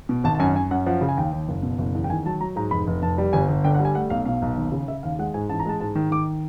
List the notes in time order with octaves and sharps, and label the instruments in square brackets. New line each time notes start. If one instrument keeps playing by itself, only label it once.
[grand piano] B2
G#1 A5
A5
F#2 G#5
F#2 G#5
F#2 F#5
F3 F#5
C#3
G#5
D#2 G5
D#2
F#1
B2
F#1
E2
G5
D#3 G#5
F#3 A5
F#3 A#5
G#2 A#5
F1 B5
F1
F1 A5
G3
G1 G#5
G1
D3 G5
F#5
G3
G#5
A3 F#5
B1 F5
B2 F5
B1
D#2
C#3
C#3 E5
D#2 F5
G#3 F#5
G#2 G#5
A1 A5
A#5
G#3 A5
G#2 A5
D#3
D#3 D6